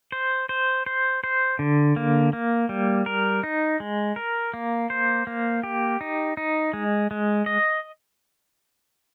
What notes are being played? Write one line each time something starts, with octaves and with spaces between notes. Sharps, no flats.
C5
C5
C5
C5
D3
A#3
A#3
G3
A#4
D#4
G#3
A#4
A#3
C5
A#3
G4
D#4
D#4
G#3
G#3
D#5